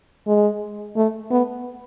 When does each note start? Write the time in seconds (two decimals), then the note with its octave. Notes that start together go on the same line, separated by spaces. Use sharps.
0.27 G#3
0.96 A3
1.31 B3